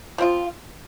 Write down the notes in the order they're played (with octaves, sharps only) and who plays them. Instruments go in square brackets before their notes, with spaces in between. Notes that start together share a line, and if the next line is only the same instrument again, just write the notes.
[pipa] F3 C4 F4